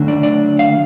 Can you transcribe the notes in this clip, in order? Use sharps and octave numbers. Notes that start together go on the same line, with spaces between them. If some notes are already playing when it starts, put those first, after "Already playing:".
Already playing: D3 F#3 A3 D4
D5
D5
F5